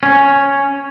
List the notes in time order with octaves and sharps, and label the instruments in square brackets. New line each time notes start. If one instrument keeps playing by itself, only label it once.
[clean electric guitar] C#4